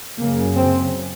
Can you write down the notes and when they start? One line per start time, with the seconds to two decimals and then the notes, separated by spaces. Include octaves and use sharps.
0.19 F#2 C#3 A#3
0.57 C4